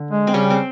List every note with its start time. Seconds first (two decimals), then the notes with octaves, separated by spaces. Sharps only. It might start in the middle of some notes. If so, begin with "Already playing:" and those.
Already playing: D3
0.11 G#3
0.27 C4
0.34 C#3 G3 C#4
0.50 C4